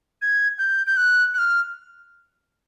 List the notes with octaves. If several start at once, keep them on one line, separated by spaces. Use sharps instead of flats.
G#6
G6
G6
F#6
F#6
F6